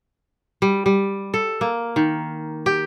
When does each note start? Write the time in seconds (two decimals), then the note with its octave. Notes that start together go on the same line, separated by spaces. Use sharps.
0.62 G3
0.86 G3
1.34 A4
1.61 A#3
1.96 D#3
2.66 G4